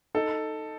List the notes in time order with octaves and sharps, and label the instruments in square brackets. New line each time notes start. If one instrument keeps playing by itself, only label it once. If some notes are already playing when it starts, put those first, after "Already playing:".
[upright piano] D#4 [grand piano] A4